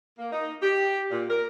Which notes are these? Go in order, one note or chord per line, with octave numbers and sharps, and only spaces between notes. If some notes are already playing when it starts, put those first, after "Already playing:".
A#3
D#4
G4
A#2
A#4